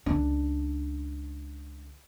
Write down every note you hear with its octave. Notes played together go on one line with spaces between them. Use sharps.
C#2 D4